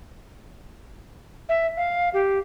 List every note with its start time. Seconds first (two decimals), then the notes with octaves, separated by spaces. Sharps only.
1.49 E5
1.77 F5
2.14 G4